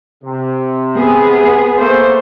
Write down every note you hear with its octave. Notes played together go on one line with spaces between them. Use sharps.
C3
B3 G#4
A3 A#3 C5